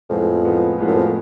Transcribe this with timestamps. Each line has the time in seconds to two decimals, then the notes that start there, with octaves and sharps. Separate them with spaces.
0.09 F2 A2 F3 G#3 B3
0.43 A2 F3 G#3 B3
0.78 A2 F3 G#3 B3
0.87 F#2
0.96 F2